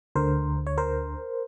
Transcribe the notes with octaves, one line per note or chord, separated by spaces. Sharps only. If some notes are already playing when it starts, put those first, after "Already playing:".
D2 D3 A#4 C5
C#5
A#4 C5